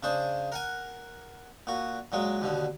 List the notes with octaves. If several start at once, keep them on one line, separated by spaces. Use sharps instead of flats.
C#3 D4 G#4 C5
A#4 F#5 G#5
A#2 F#4
A#2 F#3 G#3
D#2 B2 D3